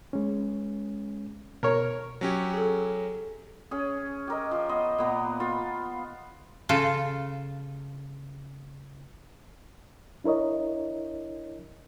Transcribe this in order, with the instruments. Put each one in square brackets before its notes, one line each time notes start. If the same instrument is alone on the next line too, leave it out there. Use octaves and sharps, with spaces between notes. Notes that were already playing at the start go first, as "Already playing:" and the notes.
[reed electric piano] G#3 C#4
[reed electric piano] B2 [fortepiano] A#4 C#5
[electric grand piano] F#3 C#4 G4
[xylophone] G#4 A4
[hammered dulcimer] C#4 G#4
G4 A#4 D#5
F3
B3 C5 D#5
A#2 B3 A#5
F4 B4
[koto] C#3 F4 A4
[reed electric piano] D4 E4 A#4 C#5 D#5